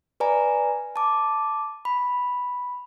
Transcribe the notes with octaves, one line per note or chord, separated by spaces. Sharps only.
B4 D5 G#5 A#5
A5 D6
B5